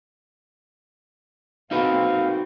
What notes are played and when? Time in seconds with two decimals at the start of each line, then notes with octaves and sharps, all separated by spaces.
1.71 A#3 C4 D#4 F#4 B4 F5